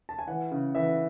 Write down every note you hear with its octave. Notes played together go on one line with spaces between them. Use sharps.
A5
G#5
E3 F#5
C#3
E3 E5